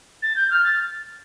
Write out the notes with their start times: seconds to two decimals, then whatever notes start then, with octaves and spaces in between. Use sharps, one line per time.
0.22 A6
0.36 G6
0.50 F6
0.64 A6